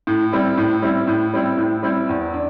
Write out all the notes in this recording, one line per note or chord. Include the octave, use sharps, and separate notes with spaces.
A2
G3 C4 E4
A2
G3 C4 E4
A2
G3 C4 E4
A2
G3 C4 E4
E2
D4